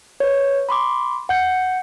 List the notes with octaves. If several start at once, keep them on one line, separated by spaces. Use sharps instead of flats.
B4 C#5
B5 C6 D6
F#5 G6 C#7